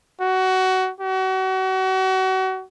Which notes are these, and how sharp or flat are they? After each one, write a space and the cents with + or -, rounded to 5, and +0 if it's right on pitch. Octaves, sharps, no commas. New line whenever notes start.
F#4 +20
F#4 +35